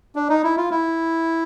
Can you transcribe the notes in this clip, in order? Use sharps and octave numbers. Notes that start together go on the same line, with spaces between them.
D4
D#4
E4
F4
E4